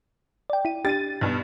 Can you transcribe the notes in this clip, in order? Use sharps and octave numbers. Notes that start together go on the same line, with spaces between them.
D5 G5
E4 D#7
D4 G4 A6 D#7
B1 G2